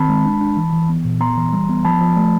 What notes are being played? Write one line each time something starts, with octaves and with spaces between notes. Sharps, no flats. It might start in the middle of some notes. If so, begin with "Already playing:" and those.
Already playing: D#3 C4 A5 B5
G#3
D4
D4
E3
E3
B3
A#2
B3 A#5 C6
E3
G3
B3
F3 A5 B5
F3
A3